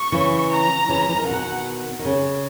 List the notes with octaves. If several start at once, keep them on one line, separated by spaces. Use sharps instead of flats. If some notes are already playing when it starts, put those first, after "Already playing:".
Already playing: C#6
C#3 E3
A#5
C#3 E3
E3
D#3
C#3
B2 D#3 F#5
D#3
C#3